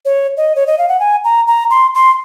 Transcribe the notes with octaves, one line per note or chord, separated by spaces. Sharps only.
C#5
D#5
C#5
D#5
F5
F#5
G#5
A#5
A#5
C6
C6